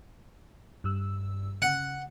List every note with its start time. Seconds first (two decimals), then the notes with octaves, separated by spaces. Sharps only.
0.84 G2 G3 E6
1.62 C#3 F#5